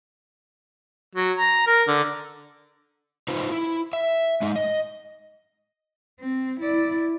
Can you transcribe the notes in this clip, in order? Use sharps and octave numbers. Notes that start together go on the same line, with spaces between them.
F#3
A#5
A#4
D3
D#4 F4 B4 C5
E4
E5
G#3 D#4 D#5
D#5
C4
E4 D5